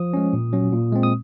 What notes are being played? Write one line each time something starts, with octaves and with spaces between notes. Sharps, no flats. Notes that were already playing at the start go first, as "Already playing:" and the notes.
Already playing: F3 D#6
G#3 C#4
A#2
F#3 C#4
A#2
G#3 C4
D#6